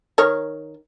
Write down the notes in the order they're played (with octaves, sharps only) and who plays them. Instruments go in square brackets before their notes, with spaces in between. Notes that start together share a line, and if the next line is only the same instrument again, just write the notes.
[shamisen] D#3 A#4 C#5